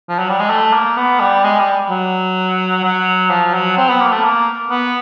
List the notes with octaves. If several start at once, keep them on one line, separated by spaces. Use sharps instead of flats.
F3
F#3
G3
G#3
A3
A#3
B3
G3
G#3
G3
F#3
F#3
F3
F#3
C4
B3
A#3
A3
A#3
B3